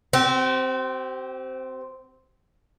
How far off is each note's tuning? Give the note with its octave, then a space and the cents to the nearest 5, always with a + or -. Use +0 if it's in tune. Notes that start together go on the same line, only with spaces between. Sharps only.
C4 -5 G4 -45